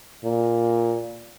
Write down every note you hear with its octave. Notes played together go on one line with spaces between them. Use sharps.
A#2